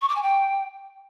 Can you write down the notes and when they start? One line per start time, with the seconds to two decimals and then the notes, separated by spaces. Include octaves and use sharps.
0.01 C#6
0.08 D6
0.15 G#5
0.22 G5